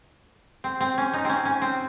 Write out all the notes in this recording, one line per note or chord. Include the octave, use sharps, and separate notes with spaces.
C4
C4
C#4
D#4
C4 C#4
C#4
C4